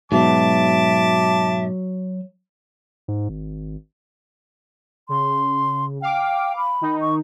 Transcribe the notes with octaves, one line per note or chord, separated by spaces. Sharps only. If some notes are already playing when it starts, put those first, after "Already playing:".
G#2 B2 F#3 E5 A5 D6
G#2
G#1
C#3 C6
F5 G5 D6
B5
D#3 D#4
C#6